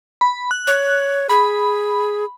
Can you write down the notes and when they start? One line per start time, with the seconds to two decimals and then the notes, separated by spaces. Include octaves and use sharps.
0.21 B5
0.51 F#6
0.67 C#5
1.29 G#4 B5